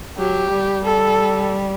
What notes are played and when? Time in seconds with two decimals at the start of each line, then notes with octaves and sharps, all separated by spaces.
0.18 F#3 G4
0.51 G3
0.85 A4